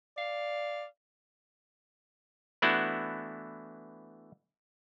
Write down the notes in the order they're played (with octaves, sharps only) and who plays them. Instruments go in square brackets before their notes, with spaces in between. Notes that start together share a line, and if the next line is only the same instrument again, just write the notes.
[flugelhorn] D5 [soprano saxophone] F5
[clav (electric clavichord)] E3 A3 B3 D4 E4 F#4